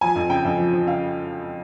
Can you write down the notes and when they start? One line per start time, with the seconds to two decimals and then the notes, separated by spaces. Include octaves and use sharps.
0.01 F3 G#5
0.16 F2
0.30 C#3 G5
0.45 F2
0.58 F3
0.73 F3
0.86 C#3 F5